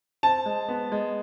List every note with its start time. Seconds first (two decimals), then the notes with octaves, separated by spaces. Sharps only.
0.23 C4 A5
0.46 G#3
0.68 B3
0.92 G#3